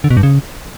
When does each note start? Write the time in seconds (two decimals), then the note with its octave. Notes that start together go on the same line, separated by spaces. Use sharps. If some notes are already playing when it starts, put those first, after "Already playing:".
0.04 D3
0.10 B2
0.17 G2
0.23 C#3